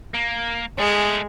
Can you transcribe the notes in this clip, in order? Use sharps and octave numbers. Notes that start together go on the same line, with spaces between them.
A#3
G#3 A3 G#4